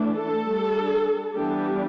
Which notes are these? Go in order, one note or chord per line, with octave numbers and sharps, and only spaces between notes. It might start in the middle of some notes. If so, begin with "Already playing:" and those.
Already playing: E3 A3 D4
A4
G3 D4
E3 G3 B3 D4 G4